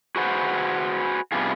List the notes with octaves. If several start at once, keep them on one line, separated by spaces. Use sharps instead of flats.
F#4 G#4 B4 C5 F#5
C3 G3 B3 D4 F4 G#4